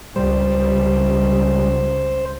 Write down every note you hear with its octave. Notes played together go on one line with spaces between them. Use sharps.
C#2 G3 C5